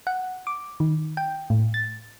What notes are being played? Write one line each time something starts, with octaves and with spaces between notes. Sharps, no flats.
F#5
D6
D#3
G5
A2
A6